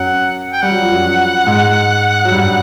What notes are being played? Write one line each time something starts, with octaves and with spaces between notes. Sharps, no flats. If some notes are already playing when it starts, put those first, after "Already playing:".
Already playing: F#2 F#3 F#5
G5
G3 F#5
F#3
F3
F#2 F#3
G#2 G#3
F#3
G2 G3